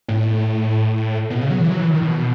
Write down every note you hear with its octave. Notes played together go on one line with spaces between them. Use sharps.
A2
B2
C#3
F#3
E3
F#3
E3
D#3
B2